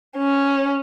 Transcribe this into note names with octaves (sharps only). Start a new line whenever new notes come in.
C#4